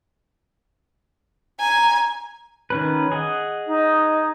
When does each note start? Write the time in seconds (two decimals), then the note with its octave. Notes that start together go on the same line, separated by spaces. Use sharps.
1.60 G#5 A#5
2.70 D#3 C#4 B4
3.12 G#4 D#5 F#5
3.66 D#4